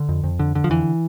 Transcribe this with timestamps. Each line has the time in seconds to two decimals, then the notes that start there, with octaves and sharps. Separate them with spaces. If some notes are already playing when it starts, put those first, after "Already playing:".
Already playing: D3
0.09 F2
0.24 F2
0.39 D3
0.55 D3
0.64 F3
0.70 F2 E3